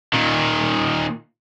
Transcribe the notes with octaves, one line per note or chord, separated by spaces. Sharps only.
A#2 D#3